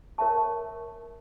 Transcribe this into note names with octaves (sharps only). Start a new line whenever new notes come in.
A#4 C#5 E5 A5 C#6